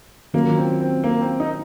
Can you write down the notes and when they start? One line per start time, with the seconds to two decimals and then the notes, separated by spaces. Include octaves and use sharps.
0.34 D#3 F#3 A#3 C#4 F4
0.58 C4
0.80 C4
1.04 A#3
1.21 C4
1.40 D#4